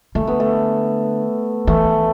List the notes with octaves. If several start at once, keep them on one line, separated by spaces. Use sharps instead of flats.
D3 A3
B3
A3
E3 A3